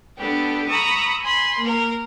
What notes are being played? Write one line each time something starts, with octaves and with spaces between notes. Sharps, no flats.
B3 D4 G4 A4
A#5 B5 C#6 D#6 E6
G#5 B5 C6
A#3 A#4